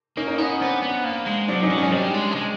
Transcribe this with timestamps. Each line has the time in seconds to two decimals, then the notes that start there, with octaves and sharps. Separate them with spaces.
0.17 A#3 C#4 D#4
0.28 C#4 D#4
0.38 B3 C#4 D#4
0.60 B3 C4 D4
0.82 B3
1.04 A#3
1.26 G#3
1.48 F#3 C4 D4
1.63 C#4 D#4
1.70 F#3
1.78 G#3 C#4 D#4
1.92 G3 C4 D4
2.14 G#3
2.32 A3
2.36 G#3